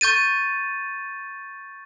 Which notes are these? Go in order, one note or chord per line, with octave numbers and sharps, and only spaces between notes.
C#6 G6 A6 D#7